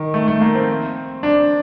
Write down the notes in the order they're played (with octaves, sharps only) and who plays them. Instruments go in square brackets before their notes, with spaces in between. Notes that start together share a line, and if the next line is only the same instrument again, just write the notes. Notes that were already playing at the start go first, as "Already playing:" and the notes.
Already playing: [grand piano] D#3
A3
A3
A#3
C4
D4